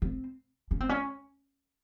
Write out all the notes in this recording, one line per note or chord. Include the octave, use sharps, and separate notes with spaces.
C4
C#4
C4
C#4